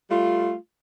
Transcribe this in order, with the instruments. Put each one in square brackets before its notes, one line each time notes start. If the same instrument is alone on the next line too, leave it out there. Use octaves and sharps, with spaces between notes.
[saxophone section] G3 A3 F4